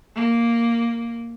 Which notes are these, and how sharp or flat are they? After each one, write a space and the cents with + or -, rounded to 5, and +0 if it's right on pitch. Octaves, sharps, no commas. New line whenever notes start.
A#3 +0